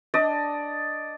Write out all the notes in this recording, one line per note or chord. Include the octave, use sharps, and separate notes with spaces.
D4 D5 D#5